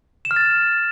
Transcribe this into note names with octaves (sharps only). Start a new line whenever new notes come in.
E7
F6
A6